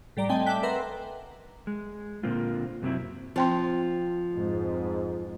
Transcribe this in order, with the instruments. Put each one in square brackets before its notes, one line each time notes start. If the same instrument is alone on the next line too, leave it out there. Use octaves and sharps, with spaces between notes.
[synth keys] A2 G3 D5 A#5
A3 C4 A4 D#5 G5 G#5
E5 G5 A5 D6 F#6 B6
A#4 B4 E5 F#5 A#5 C6
[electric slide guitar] G#3
A#2 D3 A#3 C4 F4
F#2 C3 F#3 C4 E4
[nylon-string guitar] F3 [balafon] C4 G5 C6
[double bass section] F2 G#2